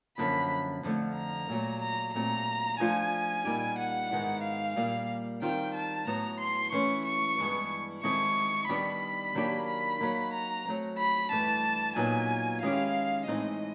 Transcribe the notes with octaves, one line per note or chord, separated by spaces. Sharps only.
F#2 D3 F3 A#3 B5
F2 D3 F3 A3
A#5
A#2 F#3 A3
A#5
A#2 F#3 A3 C4 A#5
F3 A3 D4 F4 G#5
A#2 G3 A#3 D#4 G4
F#5
G#2 D#3 G#3 B3 E4
F5
A#2 G3 A#3
D#3 G3 C4 F4 G5
A5
A2 F#3 B3 A#5
C6
E3 A3 C#4 C#6
C#6
G2 E3 G#3 B3
D#3 G#3 C4 E4 A4 C#6
D#3 G3 B3 D4 G4 B5
D#3 F#3 A#3 D4 G4
B5
F#3 A#3 D#4
A#5
F#3 A3 C4
B5
G2 E3 A3 A5
A#2 F#3 B3 D#4 G#5
D#3 G#3 C#4 E4 G4 F5
A2 E3 G#3 C4 D#4 D#5